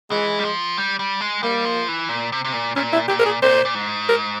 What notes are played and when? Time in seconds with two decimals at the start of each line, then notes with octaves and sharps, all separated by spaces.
0.11 E3 G#3
0.39 G3
0.45 F3
0.78 G3
0.99 G3
1.21 G#3
1.43 G3 A#3
1.65 F3
1.88 E3
2.09 A#2
2.32 C3
2.44 C3
2.53 A#2
2.76 A#2 C#4
2.93 E4
3.08 A#2 G4
3.19 A#4
3.26 G#4
3.42 A#2 C5
3.65 A#2
3.75 G#2
4.09 A#4